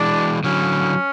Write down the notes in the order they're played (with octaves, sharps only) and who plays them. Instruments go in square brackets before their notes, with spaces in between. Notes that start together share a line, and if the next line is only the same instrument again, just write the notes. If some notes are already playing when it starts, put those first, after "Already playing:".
Already playing: [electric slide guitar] E3 G#3 [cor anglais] D4
[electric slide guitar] D3 F#3 [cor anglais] C#4